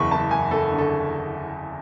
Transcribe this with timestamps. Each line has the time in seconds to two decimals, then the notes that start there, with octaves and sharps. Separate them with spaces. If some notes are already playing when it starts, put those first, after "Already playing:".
Already playing: F#1 E2 B5 C#6
0.11 F#1 A5
0.31 F#1 G#5
0.51 F#1 A4
0.72 D3
0.78 A4